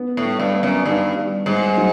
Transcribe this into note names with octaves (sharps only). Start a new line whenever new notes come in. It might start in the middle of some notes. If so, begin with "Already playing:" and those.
Already playing: B3
A2
G3
G2
B3
F#2
G2 D#3
G3
G#2 G3
F#3